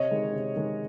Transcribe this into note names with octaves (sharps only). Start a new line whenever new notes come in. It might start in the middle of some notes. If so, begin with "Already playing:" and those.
Already playing: C3 C#5 D#5
D#3 G#3
C3
D#3 G#3